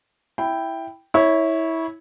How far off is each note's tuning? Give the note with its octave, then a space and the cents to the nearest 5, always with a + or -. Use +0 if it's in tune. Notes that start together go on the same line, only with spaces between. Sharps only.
E4 +0 G5 +0
E4 -20 C#5 +0